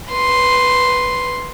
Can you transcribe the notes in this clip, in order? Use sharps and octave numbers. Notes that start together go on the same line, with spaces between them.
B4 C6